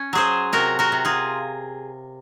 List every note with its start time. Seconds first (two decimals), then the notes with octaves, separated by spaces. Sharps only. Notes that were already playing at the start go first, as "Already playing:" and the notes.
Already playing: C#4
0.13 F#3 G#4 C5
0.53 C3 F#4 A#4
0.79 F#4 A#4
0.92 C3
1.05 F4 G#4